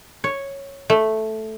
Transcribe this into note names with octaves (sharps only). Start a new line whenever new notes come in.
C#5
A3